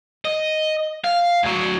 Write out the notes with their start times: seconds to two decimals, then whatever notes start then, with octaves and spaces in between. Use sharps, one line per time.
0.25 D#5
1.04 F5
1.43 D2 F#3